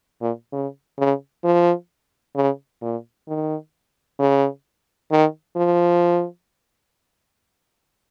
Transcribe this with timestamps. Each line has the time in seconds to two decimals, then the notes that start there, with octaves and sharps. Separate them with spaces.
0.22 A#2
0.52 C#3
0.98 C#3
1.44 F3
2.36 C#3
2.82 A#2
3.28 D#3
4.20 C#3
5.11 D#3
5.56 F3